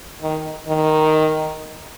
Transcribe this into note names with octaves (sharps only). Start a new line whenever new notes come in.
D#3
D#3